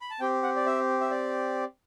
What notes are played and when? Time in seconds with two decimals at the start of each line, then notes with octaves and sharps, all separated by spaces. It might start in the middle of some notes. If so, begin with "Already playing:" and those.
0.01 B5
0.10 A5
0.20 C4 G4 G5
0.43 F#5
0.56 D5
0.66 E5
1.01 E5
1.11 D5